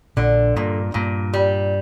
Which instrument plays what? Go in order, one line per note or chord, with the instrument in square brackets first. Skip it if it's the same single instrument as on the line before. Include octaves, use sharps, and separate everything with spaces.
[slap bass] A#1 A#2 [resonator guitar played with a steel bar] D3
[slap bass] G2 [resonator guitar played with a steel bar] A#2
[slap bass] G2 [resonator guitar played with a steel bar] A#2
[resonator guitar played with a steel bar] G3